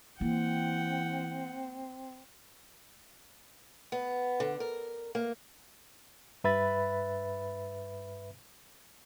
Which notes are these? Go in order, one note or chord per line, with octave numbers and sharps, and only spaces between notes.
E3 A#3 C4 F#5 G5
B3
D3
A#4
A#3
G2 B4 E5 B5 A6